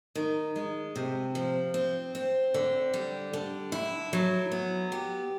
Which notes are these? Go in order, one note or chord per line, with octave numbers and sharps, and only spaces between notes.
D#3
G#3
C3
F3
C4
C4
D3
G3
D3
E4
F#3
B3
G4